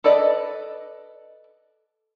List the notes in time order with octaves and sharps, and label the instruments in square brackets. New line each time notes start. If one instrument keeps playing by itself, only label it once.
[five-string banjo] A4 B4 D5 D#5